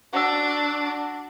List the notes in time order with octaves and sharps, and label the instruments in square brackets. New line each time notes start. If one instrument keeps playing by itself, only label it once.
[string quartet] D4 [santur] F#4 E6